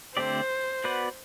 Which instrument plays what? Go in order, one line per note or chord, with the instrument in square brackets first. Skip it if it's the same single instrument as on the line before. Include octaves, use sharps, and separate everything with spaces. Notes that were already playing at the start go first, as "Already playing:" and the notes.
[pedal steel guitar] D3 A3 C4 G4 D5 [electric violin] C5
[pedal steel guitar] B3 F#4 B4 D5